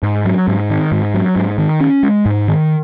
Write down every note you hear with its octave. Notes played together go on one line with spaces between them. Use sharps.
G#2
F#3
G#2
D#3
G#2
F#3
G#2
D#3
C#4
G#3
G#2
D#3